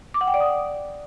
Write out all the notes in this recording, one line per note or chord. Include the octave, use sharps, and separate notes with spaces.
D6
F#5
G5
D5
D#6